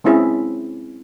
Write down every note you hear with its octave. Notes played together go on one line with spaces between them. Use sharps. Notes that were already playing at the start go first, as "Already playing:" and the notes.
G#3 C4 C#4 E4 G#4